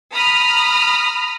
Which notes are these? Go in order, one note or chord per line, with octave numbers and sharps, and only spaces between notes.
A#5 B5 D#6 F6